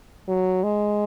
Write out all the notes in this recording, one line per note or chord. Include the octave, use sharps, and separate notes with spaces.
F#3
G#3